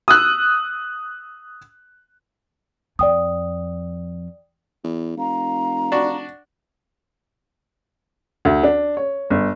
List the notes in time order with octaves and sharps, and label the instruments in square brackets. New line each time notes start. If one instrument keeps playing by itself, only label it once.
[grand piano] D#6 E6 F#6
[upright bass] F2 [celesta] D5 G5 D#6
[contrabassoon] E2
[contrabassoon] F1 [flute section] F5 A#5
[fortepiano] D4 F#4
[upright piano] D2
D4
C#5
G1